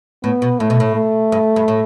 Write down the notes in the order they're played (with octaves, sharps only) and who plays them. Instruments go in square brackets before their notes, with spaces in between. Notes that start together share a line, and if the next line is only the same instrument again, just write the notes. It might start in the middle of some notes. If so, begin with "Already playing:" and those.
[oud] A2 [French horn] B3
[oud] B2
[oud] A2 [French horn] A3
[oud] B2
A2
[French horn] A3
[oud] G2
G2
A2